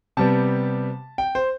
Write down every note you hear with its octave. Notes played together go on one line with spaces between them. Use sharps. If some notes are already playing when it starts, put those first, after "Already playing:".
C3 G3 B3 A5
G5
C5